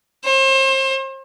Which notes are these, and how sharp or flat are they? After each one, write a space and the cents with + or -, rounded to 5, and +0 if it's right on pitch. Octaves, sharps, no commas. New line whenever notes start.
C5 +35